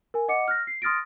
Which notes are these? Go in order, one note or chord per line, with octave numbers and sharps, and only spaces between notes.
A#4 G#5
D#5 F#5 D6 C#7
F6 F#6 A#6
C7
C6 D#6 F6 A6 A#6 D7